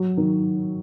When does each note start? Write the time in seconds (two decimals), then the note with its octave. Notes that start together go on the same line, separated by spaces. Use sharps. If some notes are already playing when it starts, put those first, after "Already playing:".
Already playing: F#3
0.17 D#3